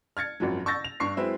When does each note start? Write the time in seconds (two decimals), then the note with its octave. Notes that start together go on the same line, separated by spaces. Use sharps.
0.17 F6 G#6 A6 C#7
0.40 G#1 F#2 F3 F#3
0.66 C#6 E6 G6 A6 A#6
0.84 F7
1.00 G2 C#6 C7
1.17 F#3 G#3 C4 E4 B4